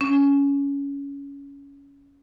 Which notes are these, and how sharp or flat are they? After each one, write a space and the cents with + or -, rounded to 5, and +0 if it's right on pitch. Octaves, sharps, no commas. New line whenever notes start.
C#4 +15